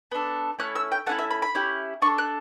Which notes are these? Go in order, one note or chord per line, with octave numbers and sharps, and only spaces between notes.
B3 D4 A4
A3 C#4 E4 F#6
E6
G5
A3 C#4 E4 F#5
E5
B5
B5
C#4 E4 G4
D4 A4 C#6
F#6